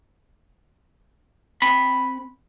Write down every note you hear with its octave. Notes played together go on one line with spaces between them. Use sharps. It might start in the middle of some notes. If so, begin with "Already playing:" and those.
C4 B5